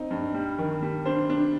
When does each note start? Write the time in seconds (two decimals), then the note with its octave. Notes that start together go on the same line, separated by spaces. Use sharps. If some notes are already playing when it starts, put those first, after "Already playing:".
Already playing: C4 D#4
0.11 G2
0.34 G3
0.59 D#3
0.82 G3
1.05 D4 C5
1.30 D4